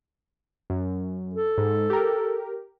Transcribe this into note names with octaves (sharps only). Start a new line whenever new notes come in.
F#2
A4
G#2
G4 A#4